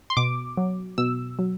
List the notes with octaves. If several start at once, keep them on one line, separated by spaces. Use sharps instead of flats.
C6
B2 D6
F#3
B2 E6
F#3